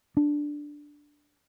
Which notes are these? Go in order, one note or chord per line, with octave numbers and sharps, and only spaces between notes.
D4